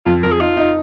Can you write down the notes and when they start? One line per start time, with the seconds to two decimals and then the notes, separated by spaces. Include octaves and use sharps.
0.06 F2 F4
0.23 F2 A#4
0.31 G#4
0.40 D#4 F4
0.57 D#4